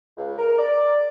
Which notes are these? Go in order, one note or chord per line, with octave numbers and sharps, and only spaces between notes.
C#2
A#4
D5